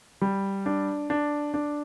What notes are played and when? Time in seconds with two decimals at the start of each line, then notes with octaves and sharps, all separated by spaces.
0.21 G3
0.66 D4
1.10 D4
1.54 D4